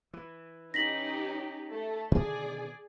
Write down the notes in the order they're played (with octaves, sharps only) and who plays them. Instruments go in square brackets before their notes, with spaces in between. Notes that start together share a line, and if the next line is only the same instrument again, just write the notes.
[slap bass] E3
[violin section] C#4 D#4 G4 [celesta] A#6 B6 F#7
[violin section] A3 A4
[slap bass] B2 D3 D#3 [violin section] G#4 D5